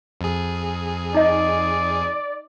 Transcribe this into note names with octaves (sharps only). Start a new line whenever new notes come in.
F2 G#4
D#4 D5 D#5